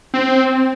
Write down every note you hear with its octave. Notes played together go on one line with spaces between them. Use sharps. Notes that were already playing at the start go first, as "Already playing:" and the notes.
C4